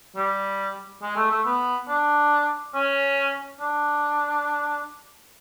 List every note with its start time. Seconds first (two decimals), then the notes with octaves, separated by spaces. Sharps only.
0.16 G3
1.02 G#3
1.16 A3
1.31 A3
1.45 B3
1.88 D4
2.74 C#4
3.60 D4